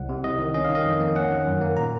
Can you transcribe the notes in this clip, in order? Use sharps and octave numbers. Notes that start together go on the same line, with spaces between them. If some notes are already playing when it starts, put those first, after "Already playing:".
Already playing: C2 F#5
C3
C2 D#5
D#3
C#4 D#5
F5
D#3
D#5
F2
A#3
C#4 F#5
D#3
F#2
A#3
A#2 A#5